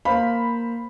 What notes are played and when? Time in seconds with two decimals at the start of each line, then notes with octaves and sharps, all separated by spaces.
0.05 A#3 C5 F5 B5